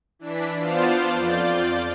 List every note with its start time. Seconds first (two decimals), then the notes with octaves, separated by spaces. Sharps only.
0.19 E3 D4 B6
0.58 B3 F4 C5 D5 F5 A5
1.12 F2 F4 D5 G6 A6